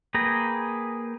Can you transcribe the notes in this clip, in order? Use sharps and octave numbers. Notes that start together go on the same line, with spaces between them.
A#3 G#4 B4 G5 A#5